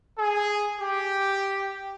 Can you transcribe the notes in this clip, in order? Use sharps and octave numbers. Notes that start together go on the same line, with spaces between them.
G#4
G4